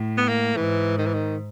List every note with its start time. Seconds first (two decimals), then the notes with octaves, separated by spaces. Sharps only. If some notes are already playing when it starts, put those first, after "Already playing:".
Already playing: A2
0.18 B3
0.29 A#3
0.56 G#2 E3
0.98 D#3
1.06 E3
1.14 D#3